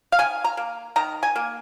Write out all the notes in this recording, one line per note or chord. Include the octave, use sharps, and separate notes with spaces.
F5
D#3 G#5
A#5
A#3
D#3 A#5
G#5
A#3